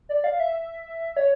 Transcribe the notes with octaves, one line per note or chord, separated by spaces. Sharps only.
D5
F5
E5
C#5